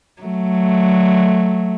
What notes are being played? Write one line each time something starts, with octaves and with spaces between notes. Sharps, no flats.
F#3 A3